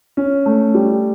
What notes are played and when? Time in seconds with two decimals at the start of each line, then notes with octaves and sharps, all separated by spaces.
0.17 C#4
0.46 A3
0.74 G3